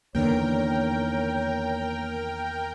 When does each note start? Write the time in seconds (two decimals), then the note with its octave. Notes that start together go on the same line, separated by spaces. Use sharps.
0.15 E2 D3 D#3 A#3 A#4 C#5 G5